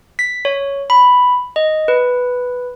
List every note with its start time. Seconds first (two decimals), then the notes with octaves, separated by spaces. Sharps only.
0.19 B6
0.45 C#5
0.90 B5
1.56 D#5
1.88 B4